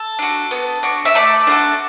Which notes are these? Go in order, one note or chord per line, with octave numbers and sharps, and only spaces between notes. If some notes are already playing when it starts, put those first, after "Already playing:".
Already playing: A4
D4 F#4
B3
D4 F#4
E5
A3 A4 D5
D4 F#4 A4